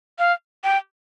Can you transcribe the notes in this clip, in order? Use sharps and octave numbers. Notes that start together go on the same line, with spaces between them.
F5
G5